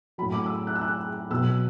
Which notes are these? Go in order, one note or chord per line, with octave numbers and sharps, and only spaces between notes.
A2 F#3 B5
D6
E6
F#6
E6
F#6
B2 F#3 E6